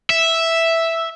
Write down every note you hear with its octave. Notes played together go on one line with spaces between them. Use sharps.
E5